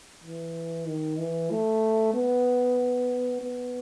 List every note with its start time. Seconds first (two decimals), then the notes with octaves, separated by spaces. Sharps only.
0.24 E3
0.87 D#3
1.19 E3
1.51 A3
2.14 B3
3.41 B3